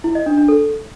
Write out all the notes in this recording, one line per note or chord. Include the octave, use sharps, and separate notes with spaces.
E4
D#5
D4
D4
A4